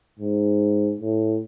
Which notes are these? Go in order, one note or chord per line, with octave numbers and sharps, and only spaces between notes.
G#2
A2